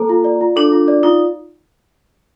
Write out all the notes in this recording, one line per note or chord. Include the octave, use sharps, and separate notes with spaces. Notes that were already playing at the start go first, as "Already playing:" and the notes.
Already playing: A#3 A4
F4
D5
F4
D4 A4
F4
D5
D#4 F4